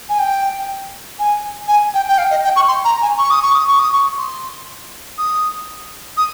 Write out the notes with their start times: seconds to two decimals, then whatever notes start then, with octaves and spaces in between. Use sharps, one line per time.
0.09 G#5
0.19 G5
1.19 G#5
1.68 G#5
1.94 G5
2.08 G5
2.18 F5
2.30 D#5
2.44 G5
2.56 C#6
2.68 C6
2.85 A#5
3.02 G#5
3.18 C#6
3.31 D#6
3.42 C#6
3.55 D#6
3.68 C#6
3.79 D#6
3.93 C#6
4.18 C6
5.18 D#6
6.17 D#6